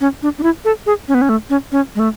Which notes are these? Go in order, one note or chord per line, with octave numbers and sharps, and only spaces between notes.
C#4
D4
D4
E4
A4
G#4
C#4
B3
C#4
A3
C#4
C#4
G#3
A3